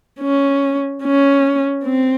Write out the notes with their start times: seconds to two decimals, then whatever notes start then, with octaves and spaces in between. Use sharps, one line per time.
0.20 C#4
1.03 C#4
1.85 C4